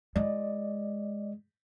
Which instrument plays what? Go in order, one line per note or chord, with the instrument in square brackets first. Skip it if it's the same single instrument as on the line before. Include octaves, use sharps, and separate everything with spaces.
[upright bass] G#3 E4 [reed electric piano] D5 D#5